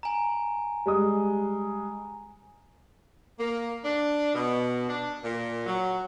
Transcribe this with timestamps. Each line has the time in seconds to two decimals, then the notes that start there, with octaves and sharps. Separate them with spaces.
0.03 G#5 A#5
0.86 G3 G#3 D#6
3.39 A#3
3.84 D4
4.34 B2
4.89 D4
5.23 A#2
5.66 F#3